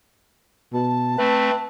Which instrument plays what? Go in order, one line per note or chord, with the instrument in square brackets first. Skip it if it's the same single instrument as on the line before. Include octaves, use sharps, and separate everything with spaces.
[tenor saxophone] B2 [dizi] A5
[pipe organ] A3 C4 [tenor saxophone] B4